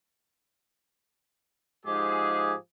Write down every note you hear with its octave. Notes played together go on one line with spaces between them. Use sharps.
G#2 F3 G#3 G4 G#4